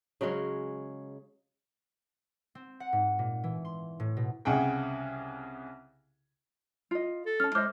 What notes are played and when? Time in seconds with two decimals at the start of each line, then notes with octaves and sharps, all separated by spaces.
0.21 C#3 F#3 G#3 C#4
2.55 C4
2.80 F#5
2.93 G#2
3.19 A#2
3.44 E3
3.65 C6
4.00 A2
4.17 B2
4.45 C2 C#3 G#4 F#5 G5
6.91 F4 D#5
7.26 A4
7.40 C#4 A5 F6
7.55 G#3 C5 C#5 D#5 D6 F6